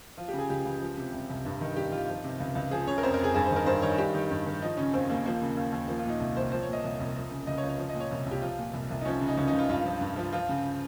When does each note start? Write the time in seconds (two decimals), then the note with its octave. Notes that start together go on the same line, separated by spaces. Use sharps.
0.18 F3 F4
0.28 G4
0.33 C#3
0.38 G#4
0.50 C#2 G4
0.65 C#2
0.81 F3
0.97 C3
1.13 C2
1.29 C2
1.45 G2
1.61 D#3
1.76 G2 G4
1.92 D#3 F4
2.09 F3
2.24 C3
2.40 C#2
2.55 C#2
2.71 F3 G#4
2.87 C#3 C#5
2.98 A#4
3.03 F2 C5
3.14 A#4
3.19 F2 G#4
3.34 G2 G#4
3.46 C5
3.51 D#3
3.56 A#4
3.66 G2 C5
3.82 D#3 C#5
3.98 G2 G4
4.14 D#3
4.31 G2
4.46 D#3
4.62 F3 D#4
4.77 C#3 C#4
4.93 D#2 C4
5.09 D#2 A#3
5.25 F3 A#3
5.42 C#3
5.57 D#2
5.72 D#2
5.88 F3 A#3
5.99 F4
6.05 A#2 D#4
6.20 C2
6.37 C2 C5
6.52 F3 C5
6.62 C#5
6.68 A#2 D#5
6.84 C2
7.00 C2
7.15 F3
7.31 C#3
7.47 C#2 D#5
7.58 C#5
7.63 C#2
7.69 C#5
7.78 F3
7.89 D#5
7.94 A#2
8.00 C#5
8.11 C2
8.26 C2
8.31 G4
8.42 F3 F4
8.58 A#2
8.73 C2
8.91 C2
9.01 D#4
9.05 F3 C#4
9.21 C#3
9.28 D#4
9.37 C#2 C#4
9.48 D#4
9.53 C#2
9.59 F4
9.69 G2 F4
9.85 F3
10.01 G2
10.16 F3
10.33 F3 F4
10.49 C#3